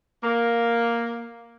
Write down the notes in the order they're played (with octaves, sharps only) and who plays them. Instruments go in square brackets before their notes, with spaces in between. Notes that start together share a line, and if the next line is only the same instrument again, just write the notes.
[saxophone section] A#3